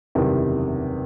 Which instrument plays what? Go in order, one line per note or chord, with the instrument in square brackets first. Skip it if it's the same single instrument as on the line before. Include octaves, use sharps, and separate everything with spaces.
[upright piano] F#1 E2 C3 D#3 G3